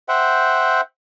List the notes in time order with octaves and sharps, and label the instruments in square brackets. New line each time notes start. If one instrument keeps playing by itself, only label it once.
[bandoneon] C5 E5 F#5 G5